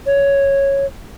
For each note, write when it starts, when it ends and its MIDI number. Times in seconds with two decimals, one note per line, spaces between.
0.07 0.86 73